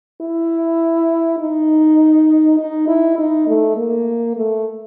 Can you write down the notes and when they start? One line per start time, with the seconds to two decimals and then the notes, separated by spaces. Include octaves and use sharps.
0.21 E4
1.39 D#4
2.59 D#4
2.88 E4
3.18 D#4
3.47 A3
3.77 A#3
4.36 A3